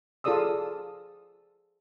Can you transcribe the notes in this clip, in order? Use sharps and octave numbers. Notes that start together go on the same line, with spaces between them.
F4 G#4 A4 D5 D#6 E6